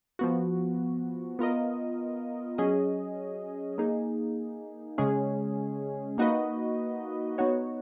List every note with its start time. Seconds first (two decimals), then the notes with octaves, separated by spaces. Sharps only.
0.19 F3 B3 F#4
1.39 B3 F4 A#4 D#5
2.58 F#3 C#4 G#4 D#5
3.78 A#3 D#4 G#4
4.98 C#3 G#3 C#4 G#4
6.18 A#3 D#4 F#4 B4 D#5
7.38 B3 D#4 F#4 C#5